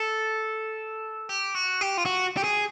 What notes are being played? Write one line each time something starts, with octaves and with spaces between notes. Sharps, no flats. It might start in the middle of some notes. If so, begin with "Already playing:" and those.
Already playing: A4
G4
F#4
G4
F4
F#4
G4
G#4